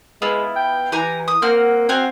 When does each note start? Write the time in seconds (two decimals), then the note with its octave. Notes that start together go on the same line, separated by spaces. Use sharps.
0.22 G#3 B3 E4 F4
0.56 G5
0.92 E3 G4 G#5 A#5
1.28 D#6
1.42 A#3 C4 F#5 F6
1.89 C4 F#4 F5 G#5